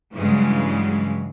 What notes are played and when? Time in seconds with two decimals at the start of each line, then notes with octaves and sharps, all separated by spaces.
0.13 G2 C#3 E3 F#3 G#3